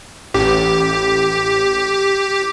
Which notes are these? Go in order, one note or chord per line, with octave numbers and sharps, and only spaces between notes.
A1 G4